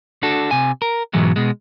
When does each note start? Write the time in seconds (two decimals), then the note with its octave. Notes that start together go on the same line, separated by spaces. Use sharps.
0.23 D4 F#4 A4
0.51 C3 G#5
0.82 A#4
1.13 G#2 B2 E3 F#3 G#3
1.36 B2 G#3